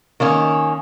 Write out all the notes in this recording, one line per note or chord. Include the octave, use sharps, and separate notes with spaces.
D#3 A#3 C#4